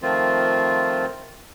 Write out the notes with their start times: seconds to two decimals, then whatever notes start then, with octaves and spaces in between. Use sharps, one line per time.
0.02 D#3 F3 A3 C4 F4